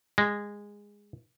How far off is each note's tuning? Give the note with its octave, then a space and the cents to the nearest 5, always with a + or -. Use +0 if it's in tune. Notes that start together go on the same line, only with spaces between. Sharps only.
G#3 -15